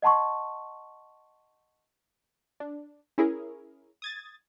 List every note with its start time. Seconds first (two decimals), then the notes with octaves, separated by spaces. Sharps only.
0.02 D#5 F#5 A5 C6 C#6
2.60 D4
3.18 C#4 E4 G#4 A#4
4.02 D#6 G#6 A6